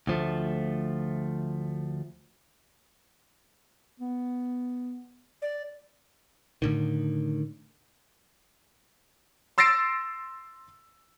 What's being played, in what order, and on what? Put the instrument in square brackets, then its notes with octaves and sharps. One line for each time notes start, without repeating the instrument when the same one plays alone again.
[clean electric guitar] D2 F3 A3
[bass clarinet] B3
[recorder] D5
[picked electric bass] A2 D3 D#3
[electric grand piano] C6 E6 A6 A#6 C7 D7